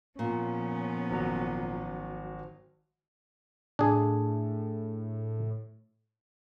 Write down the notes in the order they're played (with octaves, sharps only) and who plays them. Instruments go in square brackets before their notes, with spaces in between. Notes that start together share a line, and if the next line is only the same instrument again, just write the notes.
[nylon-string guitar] A#2 [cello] F3 B3 [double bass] C#4
[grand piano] G#1 F#3
[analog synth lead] A2 [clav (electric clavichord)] D4 G#4